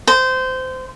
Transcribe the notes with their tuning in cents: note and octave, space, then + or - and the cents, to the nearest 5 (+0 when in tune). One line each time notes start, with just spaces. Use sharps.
C5 -20